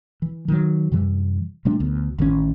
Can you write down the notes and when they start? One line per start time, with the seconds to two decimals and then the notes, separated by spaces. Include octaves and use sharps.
0.22 E3
0.48 D#3 F3 F#3
0.92 F#2 C3 E3 G3
1.65 C3 G3 A3 D4
1.80 D2 B3
2.19 A1 D#3 E3 C#4